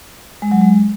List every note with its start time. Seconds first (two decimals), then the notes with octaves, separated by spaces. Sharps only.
0.42 G#3
0.51 F#3
0.61 G#3